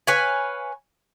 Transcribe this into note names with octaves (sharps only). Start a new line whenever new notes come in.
B4 C#5 F5 G#5